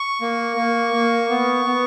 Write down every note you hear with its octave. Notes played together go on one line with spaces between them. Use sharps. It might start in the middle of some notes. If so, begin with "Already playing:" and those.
Already playing: C#6
A#3
A#3
A#3
B3
B3